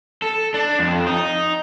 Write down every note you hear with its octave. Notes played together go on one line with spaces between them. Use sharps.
A4
D4
F2
D#4